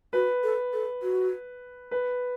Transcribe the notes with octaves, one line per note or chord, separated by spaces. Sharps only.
F#4 B4
A4
A4
F#4
B4